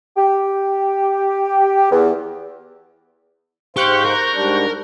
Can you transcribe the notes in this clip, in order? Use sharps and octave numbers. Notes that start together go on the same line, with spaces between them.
G4
E2
G#2 G4 C5 F5 C#6 F#6 G6
A#4
G#2 G3 D4